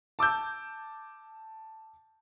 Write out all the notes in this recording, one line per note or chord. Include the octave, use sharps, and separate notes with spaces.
A5 D6 E6 G6